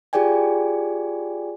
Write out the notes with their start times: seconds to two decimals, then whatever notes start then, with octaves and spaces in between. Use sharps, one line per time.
0.13 F4 G4 G#4 D5 G5 G#5